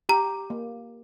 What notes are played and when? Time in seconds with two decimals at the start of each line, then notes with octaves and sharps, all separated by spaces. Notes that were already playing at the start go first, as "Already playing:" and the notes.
0.09 G4 A#5
0.50 A#3